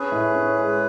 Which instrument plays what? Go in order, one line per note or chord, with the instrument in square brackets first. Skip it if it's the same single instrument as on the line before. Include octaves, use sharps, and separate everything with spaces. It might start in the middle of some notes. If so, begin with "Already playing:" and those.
Already playing: [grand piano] C#4 [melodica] G#4 B4
[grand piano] A2
C#4
G#3